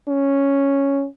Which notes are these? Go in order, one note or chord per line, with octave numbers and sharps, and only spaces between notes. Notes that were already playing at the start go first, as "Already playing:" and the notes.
C#4